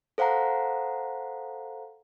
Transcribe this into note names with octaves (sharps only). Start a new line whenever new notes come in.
A4 C5 F5 F#5 A#5